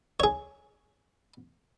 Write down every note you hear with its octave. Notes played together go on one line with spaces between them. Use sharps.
G#4 C#5